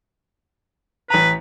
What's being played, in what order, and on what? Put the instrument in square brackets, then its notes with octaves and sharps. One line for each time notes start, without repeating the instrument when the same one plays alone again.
[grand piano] A1 A#5 [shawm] B4